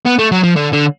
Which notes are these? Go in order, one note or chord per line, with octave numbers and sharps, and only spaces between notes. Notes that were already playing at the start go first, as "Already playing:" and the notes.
B3
A3
F#3
F3
D3
D3